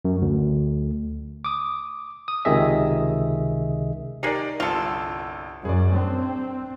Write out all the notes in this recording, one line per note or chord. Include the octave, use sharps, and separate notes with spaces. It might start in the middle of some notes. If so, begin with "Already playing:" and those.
F#2
D2
D6 D#6
D#6
C#2 C3 D#3 G#4 D#5 E5
G#3 D#4 G4 A#4 D5
G1 C2 F4 A4 C#7
F#2 G#4 D5
C4 D4